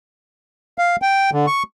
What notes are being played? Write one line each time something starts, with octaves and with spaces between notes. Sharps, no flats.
F5
G5
D3
C#6